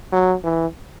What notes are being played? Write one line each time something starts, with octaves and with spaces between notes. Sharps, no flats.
F#3
E3